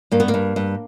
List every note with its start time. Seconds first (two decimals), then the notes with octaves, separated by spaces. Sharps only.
0.12 G2 A#3
0.20 B3
0.28 A#3
0.34 G2
0.56 G2